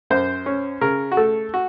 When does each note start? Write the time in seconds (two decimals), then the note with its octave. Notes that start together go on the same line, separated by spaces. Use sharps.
0.10 F#2 C5
0.46 C#4
0.81 C#3 A#4
1.12 F#4
1.17 A3 A4
1.54 F#4